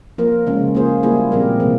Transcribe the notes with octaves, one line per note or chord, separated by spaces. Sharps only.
F3 A#3 F4 A#4
C#3 F3 G#3 C#4
A#3 F4 G#4 C5
G3 A#3 E4 G#4
A#2 F3 C4 G4 A#4
C3 E3 A#3